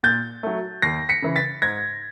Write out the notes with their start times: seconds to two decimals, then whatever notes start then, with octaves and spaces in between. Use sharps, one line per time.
0.03 A#2 G6 A6
0.43 F#3 A3
0.82 D#2 A#6 C7
1.09 B6 C#7
1.22 C#3 E3
1.36 A6 B6
1.62 G#2 G#6 A#6